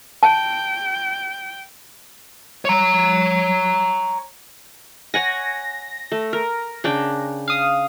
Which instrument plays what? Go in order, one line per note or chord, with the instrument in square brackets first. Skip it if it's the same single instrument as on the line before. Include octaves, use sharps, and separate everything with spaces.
[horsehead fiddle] G5 [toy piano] A5
[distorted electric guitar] C#5 A#5
[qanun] C#5 F#5 G#5 [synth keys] A#6
[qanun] A3
A#4
C#3 D4 G5
[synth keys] F5 D#6